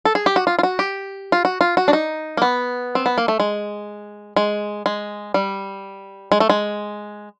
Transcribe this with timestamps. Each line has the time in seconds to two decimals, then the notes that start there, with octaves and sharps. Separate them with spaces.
0.05 A4
0.15 G#4
0.26 G4
0.36 F#4
0.47 F4
0.59 F4
0.63 F#4
0.79 G4
1.32 F4
1.45 F#4
1.61 F4
1.77 F#4
1.88 D4
1.93 D#4
2.37 A#3
2.42 B3
2.95 C4
3.06 B3
3.18 A#3
3.28 A3
3.40 G#3
4.36 G#3
4.86 G#3
5.34 G3
6.32 G#3
6.40 A3
6.49 G#3